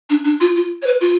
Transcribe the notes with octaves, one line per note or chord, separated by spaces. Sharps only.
D4
D4
F4
F4
C#5
B4
F4